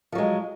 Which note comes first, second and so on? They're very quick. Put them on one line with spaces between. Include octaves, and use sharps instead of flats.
F3 F#3 G#3